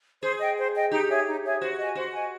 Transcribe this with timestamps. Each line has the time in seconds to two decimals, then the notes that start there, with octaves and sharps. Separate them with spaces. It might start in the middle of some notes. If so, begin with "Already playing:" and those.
0.22 G#4 C5
0.40 D#5 G5
0.58 C5
0.75 D#5 G5
0.92 D#4 G4
1.10 G#4 C#5 E5
1.27 D#4
1.44 G#4 C#5 E5
1.61 F#4 C5
1.79 D#5 G#5
1.95 F#4 C5
2.13 D#5 G#5